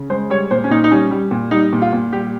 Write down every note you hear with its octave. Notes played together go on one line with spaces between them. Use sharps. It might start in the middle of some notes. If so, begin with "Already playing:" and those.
Already playing: C#3
G#3 C5
G3 C#5
A#2 C5
C#4
A#2 D#4
D#4
G3 C#4
G3
A#2
G3 D#4
A#2
F4
A#2
G3 G4